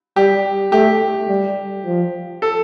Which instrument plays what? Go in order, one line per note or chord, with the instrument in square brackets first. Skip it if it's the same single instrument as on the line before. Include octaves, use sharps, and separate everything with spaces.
[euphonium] G3 [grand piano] G4
[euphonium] A3 [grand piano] G4
[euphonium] G3
F3
[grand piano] A4